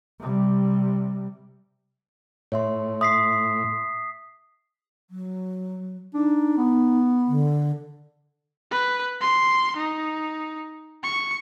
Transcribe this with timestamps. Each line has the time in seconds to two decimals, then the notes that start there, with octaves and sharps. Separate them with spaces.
0.19 C3 G3
2.52 A2 C#5 E5 C6
3.01 E5 C6 D#6 B6 C7
5.10 F#3
6.14 D4 D#4
6.57 B3
7.28 D3
8.71 B4
9.21 C6
9.77 D#4
11.03 C#6